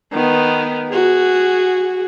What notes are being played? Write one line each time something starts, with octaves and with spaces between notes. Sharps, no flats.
D#3 B3
F#4 G#4